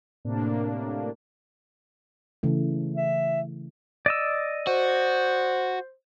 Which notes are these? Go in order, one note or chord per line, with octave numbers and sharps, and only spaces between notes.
A2 C3 A#3 D4
C#3 E3 A3
E5
D5 D#5 E6
F#4 C5